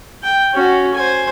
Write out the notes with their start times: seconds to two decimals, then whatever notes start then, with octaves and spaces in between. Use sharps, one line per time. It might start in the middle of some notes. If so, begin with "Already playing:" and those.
0.24 G5
0.53 C#4 F#4
0.94 C5 G#5